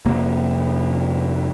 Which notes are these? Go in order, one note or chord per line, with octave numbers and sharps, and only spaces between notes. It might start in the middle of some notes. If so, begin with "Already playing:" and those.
F1 A#3